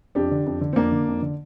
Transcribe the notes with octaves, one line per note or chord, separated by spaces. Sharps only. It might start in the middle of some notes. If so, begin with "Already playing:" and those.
F2 D4 G4
D3
F2
D3
C4
F2 A#3 D4
D3
F2
D3